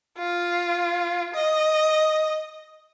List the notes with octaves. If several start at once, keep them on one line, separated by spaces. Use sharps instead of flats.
F4
D#5